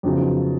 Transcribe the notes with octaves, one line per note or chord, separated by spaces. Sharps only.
F2 C#3 F#3 B3 D#4